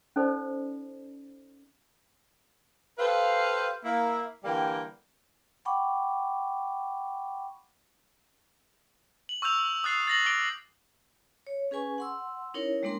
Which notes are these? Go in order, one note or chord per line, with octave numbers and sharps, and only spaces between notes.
C#4 D#4 A4 C5 D5
G4 A4 B4 C5 F5
A#3 E4
D3 E3 G3 A#3 G5
F#5 G5 B5 C#6 D6
F#7
C#6 E6 F6 G6 F7
D#6 E6 F#6 A6 C7
A6 A#6 F#7
D6 D#6 A#6 D7 G7
C#5
C#4 G#4 B4 G#5 C#6
F#5 C6 E6
C#4 D#4 E4 A#4 C#5
G3 G#3 A#3 D4 A#4 C6